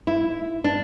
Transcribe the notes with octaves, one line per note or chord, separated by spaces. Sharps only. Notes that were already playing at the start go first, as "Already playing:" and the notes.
E4
D4